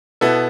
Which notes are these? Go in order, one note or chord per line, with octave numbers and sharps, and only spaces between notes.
B2 B3 E4 A4